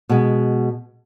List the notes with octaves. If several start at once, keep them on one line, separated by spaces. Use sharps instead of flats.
B2 G#3